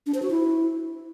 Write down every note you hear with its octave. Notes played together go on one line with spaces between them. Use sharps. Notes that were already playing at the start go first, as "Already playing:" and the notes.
D4
C5
F#4
E4